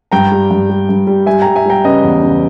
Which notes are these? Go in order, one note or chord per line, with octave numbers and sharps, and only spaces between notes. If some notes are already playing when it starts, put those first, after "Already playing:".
G2 G5 A#5
G3
G2
G3
G2
G3
G3 E5 G#5
G3 G5 A#5
E5 G#5
G3 G5 A#5
C#3 B4 D#5
E2
C#3